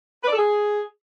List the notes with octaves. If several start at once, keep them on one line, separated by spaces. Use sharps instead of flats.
B4
D5
A4
G#4